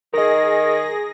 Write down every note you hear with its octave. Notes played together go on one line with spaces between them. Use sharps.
D#3 G#4 A#4 D#5 A#6